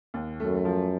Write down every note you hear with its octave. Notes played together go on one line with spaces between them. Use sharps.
D#2
F#2 A3
F3